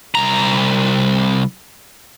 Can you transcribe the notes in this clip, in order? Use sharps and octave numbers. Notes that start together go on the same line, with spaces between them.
C2 A#5